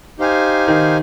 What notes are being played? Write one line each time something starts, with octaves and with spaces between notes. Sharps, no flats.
D#4 G4 C5 F5 G#5
D#3